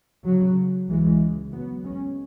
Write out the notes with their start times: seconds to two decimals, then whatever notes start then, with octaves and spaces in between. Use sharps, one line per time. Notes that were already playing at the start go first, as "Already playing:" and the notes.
0.25 C#3 F#3
0.88 C#2 C#3 E3 G#3
1.51 F#3 B3
1.83 G#3 C#4